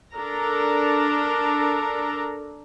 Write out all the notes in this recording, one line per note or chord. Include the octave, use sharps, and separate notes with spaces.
D4 A4 A#4 A#5